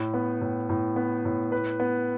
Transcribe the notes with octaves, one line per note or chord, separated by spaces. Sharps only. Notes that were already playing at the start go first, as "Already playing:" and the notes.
Already playing: A2
B3
A2
A2
B3
A2
B4
B3